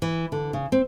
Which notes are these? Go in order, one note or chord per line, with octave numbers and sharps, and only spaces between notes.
E3
D3
C#3
C4